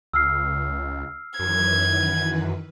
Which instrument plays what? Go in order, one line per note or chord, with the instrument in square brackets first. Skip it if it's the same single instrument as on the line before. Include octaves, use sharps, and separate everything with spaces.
[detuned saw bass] C#2 [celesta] E6 F6 C7
[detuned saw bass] F#2 [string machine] D#3 E3 B4 [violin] G#6